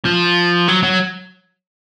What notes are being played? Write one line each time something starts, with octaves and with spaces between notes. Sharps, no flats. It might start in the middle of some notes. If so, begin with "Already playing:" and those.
F3
F#3
F#3